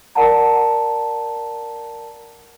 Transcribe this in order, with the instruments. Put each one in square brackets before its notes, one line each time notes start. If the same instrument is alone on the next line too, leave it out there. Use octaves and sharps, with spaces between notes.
[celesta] A#4 D5 F#5 A5 A#5